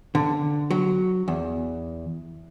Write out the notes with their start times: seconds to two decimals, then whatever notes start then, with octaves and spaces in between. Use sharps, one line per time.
0.15 D3
0.71 F#3
1.28 E2